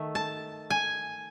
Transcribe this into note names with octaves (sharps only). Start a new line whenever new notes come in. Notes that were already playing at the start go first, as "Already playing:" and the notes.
Already playing: D#3 A3
A5
G#5